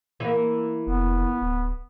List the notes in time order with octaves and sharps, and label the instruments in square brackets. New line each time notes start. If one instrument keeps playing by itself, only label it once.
[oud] E3 A#3
[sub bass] F1 [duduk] B3
[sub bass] D1